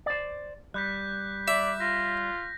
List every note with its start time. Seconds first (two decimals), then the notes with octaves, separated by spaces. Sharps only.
0.06 C5 D5
0.74 G3 F#6 G6 B6
1.48 D5 E5
1.80 F4 A#6